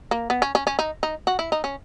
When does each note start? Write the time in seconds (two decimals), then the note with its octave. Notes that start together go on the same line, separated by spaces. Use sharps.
0.11 A#3
0.30 B3
0.42 C#4
0.55 C#4
0.67 C#4
0.79 D#4
1.03 D#4
1.27 F#4
1.39 E4
1.52 D#4
1.64 C#4